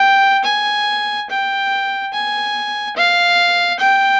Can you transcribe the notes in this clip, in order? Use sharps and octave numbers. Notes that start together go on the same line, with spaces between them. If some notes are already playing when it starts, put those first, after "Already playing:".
Already playing: G5
G#5
G5
G#5
F5
G5